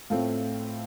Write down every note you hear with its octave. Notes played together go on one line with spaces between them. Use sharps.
A2 A3 C4 F4